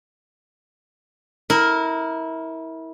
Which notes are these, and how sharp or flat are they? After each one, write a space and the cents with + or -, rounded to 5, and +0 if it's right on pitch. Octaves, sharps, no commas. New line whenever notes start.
E4 -25 A#4 +0